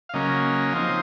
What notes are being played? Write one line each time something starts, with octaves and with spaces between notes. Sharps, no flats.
F5
C#3 F#3 A#3 C#4 D#5
F3 C4 D#4